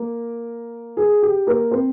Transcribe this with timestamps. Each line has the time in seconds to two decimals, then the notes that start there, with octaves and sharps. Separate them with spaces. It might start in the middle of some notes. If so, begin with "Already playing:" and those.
Already playing: A#3 A#4
0.97 G#4
1.22 G4
1.47 A#3 A#4
1.71 C4 C5